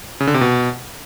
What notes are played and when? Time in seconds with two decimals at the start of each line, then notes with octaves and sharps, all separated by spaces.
0.20 C#3
0.27 D3
0.34 C3
0.41 B2